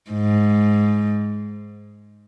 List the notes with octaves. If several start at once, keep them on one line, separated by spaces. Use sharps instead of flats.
G#2